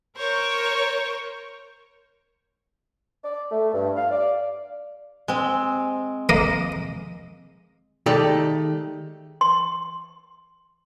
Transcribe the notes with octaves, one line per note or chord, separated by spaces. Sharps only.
A#4 C5 C#5 C#6
D5
A3
G2
F5
D5
G#3 C4
A#3 D#5
D#3 G#3 A3 G4 A4 D5
C6